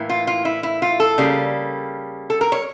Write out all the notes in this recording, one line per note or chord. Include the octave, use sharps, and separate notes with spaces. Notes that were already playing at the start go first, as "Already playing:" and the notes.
Already playing: A2 E3 A#3
F4
F4
E4
E4
F4
A4
C#3 G3 A#3
A4
A#4
C#5